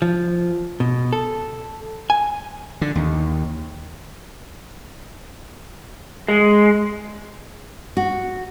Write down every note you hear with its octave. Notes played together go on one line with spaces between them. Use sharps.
F3
B2
A4
G#5
D3
D#2
G#3
F#4